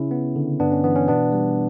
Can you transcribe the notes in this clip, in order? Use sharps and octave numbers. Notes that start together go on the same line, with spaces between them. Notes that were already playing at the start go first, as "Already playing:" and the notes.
Already playing: C#3 C#4 E4
B3
D3
G2 B3 D4
C#4
E3 B3
C#4
B2 B3 D4
G3